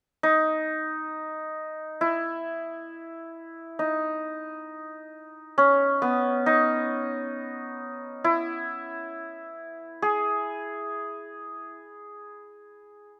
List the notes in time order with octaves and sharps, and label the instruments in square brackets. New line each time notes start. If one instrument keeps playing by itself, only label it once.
[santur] D#4
E4
D#4
C#4
B3
D#4
E4
G#4